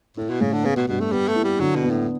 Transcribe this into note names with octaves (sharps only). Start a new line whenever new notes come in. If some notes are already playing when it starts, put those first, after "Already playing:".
A2 E4
B2
A2 C#3
D3
C#3 B3
B2
G2 B2
A3
G3 B3
A3
E4
G3
D3 F#3
B2
B3
A2